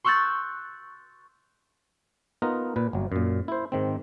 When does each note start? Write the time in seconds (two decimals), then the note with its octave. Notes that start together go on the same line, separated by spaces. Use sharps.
0.04 C6 C#6 E6 F#6 G6 A6
2.42 B3 D#4 F4 A#4 B4
2.76 A#2 B4
2.93 G1 F#3
3.12 F#2 A#2
3.48 E4 C5
3.72 G#2 D#3 C4